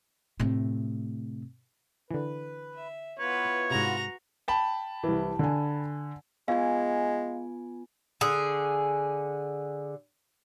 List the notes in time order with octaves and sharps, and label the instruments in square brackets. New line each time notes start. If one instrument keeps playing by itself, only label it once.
[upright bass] A2 C3
[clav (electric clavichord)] D3 E3 [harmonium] B4
[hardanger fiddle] E5
[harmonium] B3 E4 F4 [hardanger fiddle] B4 [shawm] C#5
[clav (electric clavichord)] G#2 C3 [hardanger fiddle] F#4 A#5
[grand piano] G5 A5 B5
[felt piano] C2 E3
D3 G#5
[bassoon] G#3 [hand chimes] B3 F4 G#5 [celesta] F5
[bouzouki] D3 G#4